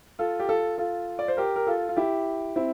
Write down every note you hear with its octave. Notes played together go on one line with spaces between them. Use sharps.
F4 A4
G4
F4 A4
F4 A4
D5
C5
G4 A#4
A#4
F4 A4
F4
E4 G4
C4 E4